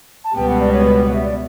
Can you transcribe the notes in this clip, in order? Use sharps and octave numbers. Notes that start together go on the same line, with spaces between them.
A5
C#2 B2 G3 B3 G5
F#5
D5
C#5
B4
F#5
E5
D5